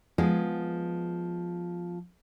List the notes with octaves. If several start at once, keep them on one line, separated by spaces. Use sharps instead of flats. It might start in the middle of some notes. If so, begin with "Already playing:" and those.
F3 G#3 B3 G#4